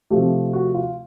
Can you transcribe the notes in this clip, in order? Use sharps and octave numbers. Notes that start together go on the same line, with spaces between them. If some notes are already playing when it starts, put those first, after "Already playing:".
C3 F3 A3 G4
F#4
F4